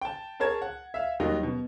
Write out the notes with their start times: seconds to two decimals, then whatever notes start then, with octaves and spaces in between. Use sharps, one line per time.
0.01 G5 A5
0.40 G#4 A#4 C#5 A5 G#6
0.62 F#5
0.94 E5 F5
1.20 D#2 D#3 F#3 G3 D#4
1.43 B2